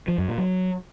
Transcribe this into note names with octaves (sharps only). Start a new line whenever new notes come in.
F3
F#2
A#2
F#3